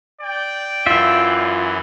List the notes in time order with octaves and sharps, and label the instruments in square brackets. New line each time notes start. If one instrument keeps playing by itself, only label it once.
[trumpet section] D5 G5
[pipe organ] F#2 E3 [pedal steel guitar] F4 E5